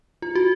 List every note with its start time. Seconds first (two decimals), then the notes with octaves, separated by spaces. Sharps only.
0.22 F4
0.35 F#4